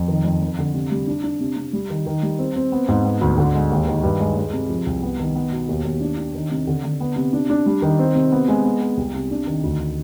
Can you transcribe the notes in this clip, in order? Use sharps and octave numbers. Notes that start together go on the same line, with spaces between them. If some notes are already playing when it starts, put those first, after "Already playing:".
Already playing: F2
D#3
F2
F2
D3
C3
G3
D4
D4
C3
C3
G3
D#3
D#3
G3
C4
C4
B3
G#2
B3
D2
D3
G#3
D#2
D#3
G2
G#3
G#3
C3
F3
C2
B3
D#3
B3
B2
D#2
D#2
D4
D4
D#3
C3
D3
D3
B3
C3
D4
D4
G3
D#3
C4
C3
B3
G#3
B3
B3
C2
C3
D4
D#3
D2